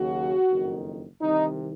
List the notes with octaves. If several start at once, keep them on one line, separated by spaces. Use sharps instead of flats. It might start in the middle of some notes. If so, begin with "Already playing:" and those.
Already playing: D#2 C#3 F#3 F#4
F#1 F2 D#3
C2 C3 D#3 D#4